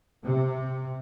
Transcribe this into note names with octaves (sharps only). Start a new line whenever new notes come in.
C3